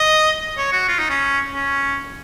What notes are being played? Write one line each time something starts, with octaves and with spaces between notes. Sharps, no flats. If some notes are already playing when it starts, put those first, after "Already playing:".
Already playing: D#5
C#5
F#4
F4
D#4
C#4
C#4